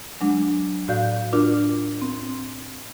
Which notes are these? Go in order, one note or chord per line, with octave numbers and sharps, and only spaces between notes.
F#3 G#3 D4
A2 F#4 D5 F5 G6
D4 F4 F#4 A#4 D5
C4